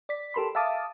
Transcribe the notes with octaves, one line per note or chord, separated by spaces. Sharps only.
D5 B6
G4 A4 A#4 B5 C6
E5 F5 A5 D6 D#6